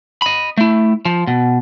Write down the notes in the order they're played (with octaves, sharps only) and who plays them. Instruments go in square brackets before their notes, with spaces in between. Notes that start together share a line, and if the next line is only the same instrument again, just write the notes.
[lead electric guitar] D#5 B5
A3 E4
F3
B2